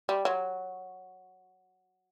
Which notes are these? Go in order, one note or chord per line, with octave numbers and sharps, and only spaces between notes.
G3
F#3